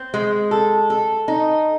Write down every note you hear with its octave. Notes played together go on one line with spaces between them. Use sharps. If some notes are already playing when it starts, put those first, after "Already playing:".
Already playing: C4
G#3
A4
A4
D#4